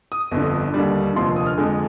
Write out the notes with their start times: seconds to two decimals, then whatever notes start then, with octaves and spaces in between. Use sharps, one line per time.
0.12 D#6
0.32 G1 F2 D3
0.74 D#2 D3 G3
1.16 F1 D#2 D3 F3 C6
1.36 D#6
1.47 F6
1.58 F2 D3 G#3